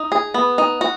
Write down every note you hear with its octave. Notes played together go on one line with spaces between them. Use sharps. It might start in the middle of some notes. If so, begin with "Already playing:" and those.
Already playing: D#4
G#4
B3
D#4
F#4